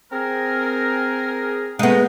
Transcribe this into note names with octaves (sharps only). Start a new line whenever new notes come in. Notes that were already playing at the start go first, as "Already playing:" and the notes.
C4 G#4 A#4
G#3 A3 B3 C#4 D#4